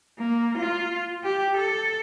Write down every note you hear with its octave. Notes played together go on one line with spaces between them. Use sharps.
A#3
F4
G4
A4